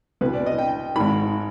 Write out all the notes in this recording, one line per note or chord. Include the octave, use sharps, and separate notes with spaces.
C2 B2 B4
D5
D#5
G5
G#1 G#2 D#3 B5